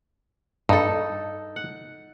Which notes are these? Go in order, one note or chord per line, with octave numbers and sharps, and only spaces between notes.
G2 D#4 A4
F#5